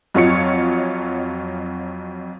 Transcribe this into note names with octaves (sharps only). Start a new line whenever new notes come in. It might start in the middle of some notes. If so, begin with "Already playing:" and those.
F2 F#3 F4 C#5 D#5 C#7